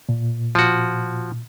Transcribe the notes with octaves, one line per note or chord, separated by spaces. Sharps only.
A#2
F3 F#4